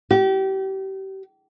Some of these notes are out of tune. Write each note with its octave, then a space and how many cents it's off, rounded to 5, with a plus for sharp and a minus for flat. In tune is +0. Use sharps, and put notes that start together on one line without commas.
G4 -30